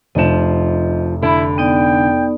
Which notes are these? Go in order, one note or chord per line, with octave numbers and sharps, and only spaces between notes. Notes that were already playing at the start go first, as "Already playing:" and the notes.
F1 F3 D4 D#5 E7
D3 E4 B5
B3 D#4 D5 G5